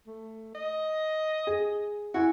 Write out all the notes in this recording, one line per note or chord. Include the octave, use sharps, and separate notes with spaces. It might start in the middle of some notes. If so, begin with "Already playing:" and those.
A3
D#5
G#4
E4 F#4 G#5